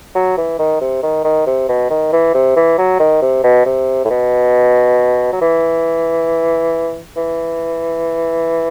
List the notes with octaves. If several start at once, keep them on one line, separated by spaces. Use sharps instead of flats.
F#3
E3
D#3
C3
D#3
D#3
C3
B2
D#3
E3
C3
E3
F#3
D#3
C3
B2
C3
A2
B2
F#3
E3
E3